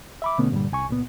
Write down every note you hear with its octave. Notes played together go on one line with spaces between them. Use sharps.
E5 B5 D6
B2 D3 A3 B3 C#4
G2 A#2 D3 G3
C2 G#5 C#6
C#2 A#2 B3